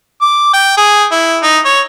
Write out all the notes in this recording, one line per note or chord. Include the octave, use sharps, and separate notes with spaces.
D6
G5
G#4
E4
D#4
C#5